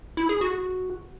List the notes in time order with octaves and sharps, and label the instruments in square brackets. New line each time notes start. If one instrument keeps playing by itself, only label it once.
[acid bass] E4
G#4
F#4